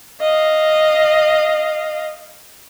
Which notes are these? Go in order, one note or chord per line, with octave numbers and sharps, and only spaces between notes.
D#5 F5